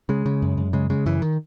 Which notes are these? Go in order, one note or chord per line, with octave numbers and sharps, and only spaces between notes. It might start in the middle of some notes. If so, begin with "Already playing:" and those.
C#3 G#3
C#3
F#2
F#2
C#3 G#3
C#3 G#3
F#2 E3
D#3